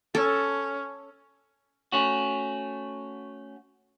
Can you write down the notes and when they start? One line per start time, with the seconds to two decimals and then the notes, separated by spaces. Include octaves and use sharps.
0.15 C#4 A4
1.92 A3 C#4 F#4